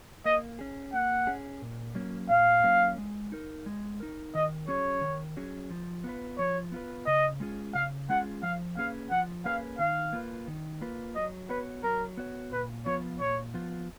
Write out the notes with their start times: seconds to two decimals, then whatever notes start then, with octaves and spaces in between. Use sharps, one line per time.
0.25 A#3 D#5
0.59 C#4 G#4
0.93 A#3 F#5
1.27 C#4 G#4
1.62 A#2
1.95 F#3 A#3 C#4
2.29 A#2 F5
2.64 F#3 A#3 C#4
2.98 G#3
3.32 D#4 A#4
3.66 G#3
4.00 D#4 A#4
4.34 D#3 D#5
4.68 F#3 C#4 G#4 C#5
5.01 D#3
5.37 F#3 C#4 G#4
5.70 F3
6.04 B3 F4 B4
6.38 F3 C#5
6.72 B3 F4 B4
7.06 C#3 D#5
7.40 G#3 C#4 F4 G#4
7.74 C#3 F5
8.09 G#3 C#4 F4 G#4 F#5
8.43 F3 F5
8.77 A#3 C#4 G#4 B4 F5
9.11 F3 F#5
9.45 A#3 C#4 G#4 B4 F5
9.79 D#3 F5
10.13 A#3 F4 B4
10.48 D#3
10.81 A#3 F4 B4
11.15 F#3 D#5
11.49 B3 F#4 B4 C#5
11.83 F#3 A#4
12.17 B3 F#4 C#5
12.52 A#2 B4
12.86 F3 B3 F4 C#5
13.20 A#2 C#5
13.54 F3 B3 F4